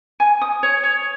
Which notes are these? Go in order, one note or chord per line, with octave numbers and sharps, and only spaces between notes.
G#5
D#6
C#5
C#5